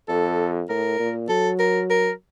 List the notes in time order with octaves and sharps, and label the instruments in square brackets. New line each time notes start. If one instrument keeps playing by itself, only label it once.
[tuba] F2 [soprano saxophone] A4
[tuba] A2 [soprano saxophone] A#4
[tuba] A#2
[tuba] F#3 [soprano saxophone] A4
[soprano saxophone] A#4
A#4